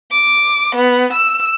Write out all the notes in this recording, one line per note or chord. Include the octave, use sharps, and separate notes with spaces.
D6
B3
E6